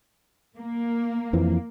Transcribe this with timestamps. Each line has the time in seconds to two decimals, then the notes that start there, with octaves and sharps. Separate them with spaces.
0.57 A#3
1.33 F2 E3 F3